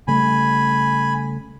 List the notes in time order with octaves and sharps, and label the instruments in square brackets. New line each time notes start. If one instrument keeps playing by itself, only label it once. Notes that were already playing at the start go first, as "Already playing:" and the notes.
[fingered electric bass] C#3 G3 A3 [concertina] G#5 B5